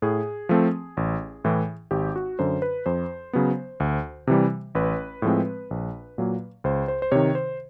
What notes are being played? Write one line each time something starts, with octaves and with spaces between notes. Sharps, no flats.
A2 G#4
F3 A3 C4
A1
A2 E3
G#1 G4
F#4
F#2 D3 C5
B4
F2 C5
C#3 F#3 B3
D2
C3 E3 G3
A1 B4
A2 F3 G#3 C4
A#1
A#2 F#3 A#3
C#2 C5
C5
C5
C3 D#3 C#5
C5